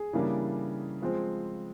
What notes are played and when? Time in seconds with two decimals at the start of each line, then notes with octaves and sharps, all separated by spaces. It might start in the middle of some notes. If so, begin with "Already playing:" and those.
Already playing: G#4
0.13 C#3 E3 G3 A#3 D4
1.02 F3 G#3 C4